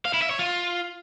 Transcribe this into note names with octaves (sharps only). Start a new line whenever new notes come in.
F5
E4
E5
C#5
F4